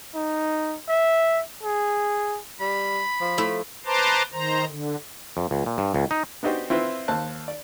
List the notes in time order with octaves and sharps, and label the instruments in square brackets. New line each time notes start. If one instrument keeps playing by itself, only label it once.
[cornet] D#4
E5
G#4
[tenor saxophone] G3 [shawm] B5
[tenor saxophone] F3
[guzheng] A3 E4
[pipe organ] B4 C5 A5 A#5 C6 D6
D#3 C5 A#5
D3
[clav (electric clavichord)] F2
C#2
A#2
G2
C#2
D#4
[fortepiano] B3 D4 D#4 F#4 G4 C5
C4 E4 F4 B4
D#2 C5 A5 F#6
D5